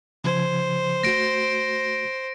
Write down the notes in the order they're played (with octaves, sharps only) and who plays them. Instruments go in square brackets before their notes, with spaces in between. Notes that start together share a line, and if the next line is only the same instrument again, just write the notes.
[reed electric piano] C#3 F3 G#6 [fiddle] C5
[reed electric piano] A3 F#4 [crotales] A#6 D7